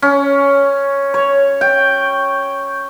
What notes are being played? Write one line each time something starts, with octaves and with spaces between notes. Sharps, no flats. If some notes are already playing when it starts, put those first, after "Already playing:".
C#4
C#5
G5